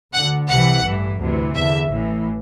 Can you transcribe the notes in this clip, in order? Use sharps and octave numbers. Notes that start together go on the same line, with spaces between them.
D2 D3 F#5
C2 C3 E3 F#5
A1 G2 E3
D2 C3 E3
E2 D3 E5
A1 A2 E3